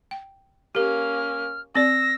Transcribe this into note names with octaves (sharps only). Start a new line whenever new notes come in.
G5
A#3 C#4 G4 A#4 F6
C4 D5 E6 A#6